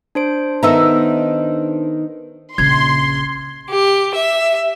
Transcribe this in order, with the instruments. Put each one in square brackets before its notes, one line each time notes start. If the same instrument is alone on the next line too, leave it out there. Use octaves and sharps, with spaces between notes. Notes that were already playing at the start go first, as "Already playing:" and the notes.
[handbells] D4 C5 D7
[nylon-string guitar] D#3 B3 D#4 [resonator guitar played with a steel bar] A4 E5 A#5
[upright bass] A#1 C#3 [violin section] C6 [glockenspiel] G#6
[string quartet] G4
E5